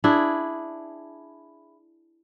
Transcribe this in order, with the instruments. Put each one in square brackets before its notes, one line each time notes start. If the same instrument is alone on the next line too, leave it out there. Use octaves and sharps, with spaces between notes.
[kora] D4 E4 G#4